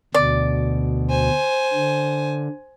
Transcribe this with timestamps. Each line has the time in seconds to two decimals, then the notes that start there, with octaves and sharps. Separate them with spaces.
0.14 D2 B2 D5
1.10 C5 G#5
1.73 D3